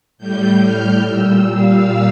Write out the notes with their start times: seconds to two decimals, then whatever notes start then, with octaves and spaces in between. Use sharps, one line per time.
0.18 A2 G3 G6
0.62 F6
1.07 A#2 G3 E6
1.51 F5